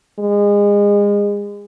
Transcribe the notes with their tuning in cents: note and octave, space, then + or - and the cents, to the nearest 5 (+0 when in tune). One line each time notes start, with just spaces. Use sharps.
G#3 -30